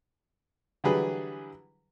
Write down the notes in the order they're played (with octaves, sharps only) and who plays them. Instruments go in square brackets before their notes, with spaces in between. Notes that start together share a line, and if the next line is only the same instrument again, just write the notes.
[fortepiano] D3 E3 F#3 G3 G#4 B4